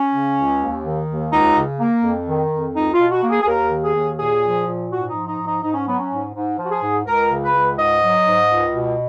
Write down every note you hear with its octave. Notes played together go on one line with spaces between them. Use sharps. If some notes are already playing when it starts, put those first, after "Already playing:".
Already playing: C#4
C#3
C#2
D#2
D#3
D#2
C#2 D#4
C#3
A#3
F2
D#3
F2
C#2 D#4
F4
B2
F#4
A#3
G#4
G#4
D#2 A#4
D#3
G#4
D#2
A#2 G#4
F3
A#2
G#2 F#4
D#4
F3
D#4
G#2
D#4
G#2 D#4
C#4
F#3 B3
C#4
G#2
G#2
F3
F#4
G#4
G#2
C#2 A#4
C#3
B4
C#2
G#2 D#5
F#3
G#2
C#2
B2